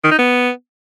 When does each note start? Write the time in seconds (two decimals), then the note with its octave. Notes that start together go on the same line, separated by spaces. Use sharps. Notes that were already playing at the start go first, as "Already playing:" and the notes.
0.04 D#3
0.11 D#4
0.19 B3